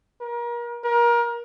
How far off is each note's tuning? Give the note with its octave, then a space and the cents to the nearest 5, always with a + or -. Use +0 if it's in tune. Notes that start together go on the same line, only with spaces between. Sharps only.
A#4 +35
A#4 +25